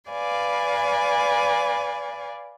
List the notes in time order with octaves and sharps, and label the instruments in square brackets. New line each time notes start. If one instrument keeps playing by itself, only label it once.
[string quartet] B4 D5 F5 G#5